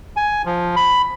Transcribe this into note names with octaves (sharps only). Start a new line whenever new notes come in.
G#5
F3
B5